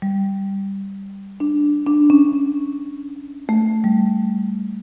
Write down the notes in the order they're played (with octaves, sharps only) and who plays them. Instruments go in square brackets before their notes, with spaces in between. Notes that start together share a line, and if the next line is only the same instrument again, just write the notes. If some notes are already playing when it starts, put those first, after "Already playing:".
[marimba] G3
D4
D4
C#4
A3
G3